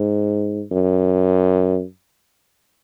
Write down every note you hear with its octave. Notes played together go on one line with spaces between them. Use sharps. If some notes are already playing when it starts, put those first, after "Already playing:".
Already playing: G#2
F#2